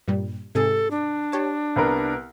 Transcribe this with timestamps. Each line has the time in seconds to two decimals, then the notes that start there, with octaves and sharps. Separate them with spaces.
0.08 G2 A#2 G3
0.55 G#2 C3 G#4 A4
0.91 D4
1.32 G4 C#5 A5
1.76 C2 B3 A#4